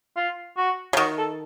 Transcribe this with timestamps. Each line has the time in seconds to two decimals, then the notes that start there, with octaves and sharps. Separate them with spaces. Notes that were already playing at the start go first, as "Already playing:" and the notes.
0.17 F4
0.57 F#4
0.93 C#3
0.97 D#3 F#4
1.18 A4